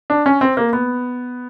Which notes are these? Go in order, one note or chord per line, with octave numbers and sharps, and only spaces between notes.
D4
C#4
C4
A#3
B3